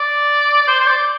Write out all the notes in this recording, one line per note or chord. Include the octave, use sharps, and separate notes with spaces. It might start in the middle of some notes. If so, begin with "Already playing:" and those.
Already playing: D5
D5
C5
C5
D5